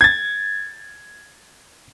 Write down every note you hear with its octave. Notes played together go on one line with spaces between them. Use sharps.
G#6 A6